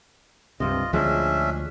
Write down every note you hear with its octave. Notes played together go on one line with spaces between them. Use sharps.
C#2 G2 C3 F4 D#5
D2 F3 G#3 C#4 D4 E5